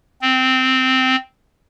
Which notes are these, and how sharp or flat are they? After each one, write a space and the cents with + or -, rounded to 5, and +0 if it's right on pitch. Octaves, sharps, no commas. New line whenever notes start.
C4 -10